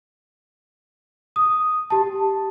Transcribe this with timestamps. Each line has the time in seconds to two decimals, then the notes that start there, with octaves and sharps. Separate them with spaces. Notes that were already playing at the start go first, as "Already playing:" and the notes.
1.36 D#6
1.90 G4 A5